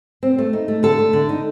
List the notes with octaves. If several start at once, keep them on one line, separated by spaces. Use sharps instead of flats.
C4
A3
D#4
A3
D3 A4
A3
D3
D#4